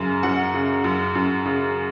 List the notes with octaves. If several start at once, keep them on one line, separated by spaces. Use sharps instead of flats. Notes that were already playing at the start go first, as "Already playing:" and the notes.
Already playing: F#2 C#3 G#5
F#2 F#5
C#3
F#2
F#2
C#3